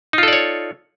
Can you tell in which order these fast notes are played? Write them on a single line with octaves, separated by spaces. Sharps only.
D#4 F4 A4 D5 C#5